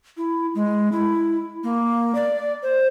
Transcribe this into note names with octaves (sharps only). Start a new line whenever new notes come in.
E4
G#3
E4
A#3
D5
C5